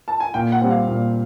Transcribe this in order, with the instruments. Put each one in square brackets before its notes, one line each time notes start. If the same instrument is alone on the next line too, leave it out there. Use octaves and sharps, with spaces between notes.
[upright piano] A5
G#5
[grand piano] A#2 [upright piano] G5
[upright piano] F#5
[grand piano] G3 C4
[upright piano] F5
[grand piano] A#2